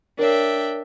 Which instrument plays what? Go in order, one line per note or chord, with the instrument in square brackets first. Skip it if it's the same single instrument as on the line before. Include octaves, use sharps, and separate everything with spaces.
[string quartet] D4 E5 G5 [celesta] A#4 C#5